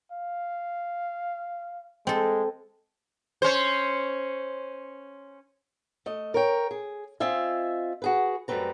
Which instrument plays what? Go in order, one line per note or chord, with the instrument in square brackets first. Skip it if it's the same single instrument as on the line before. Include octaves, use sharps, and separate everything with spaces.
[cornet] F5
[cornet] G#3 [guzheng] C4 A4
[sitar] C#4 C5
[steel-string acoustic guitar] A3 D#5
A#4 C#5 G5
G#4
C4 F4 D#5 E5 G#5
F#4 G#4 B4
F#2 G3 A3 C4 B4 A#5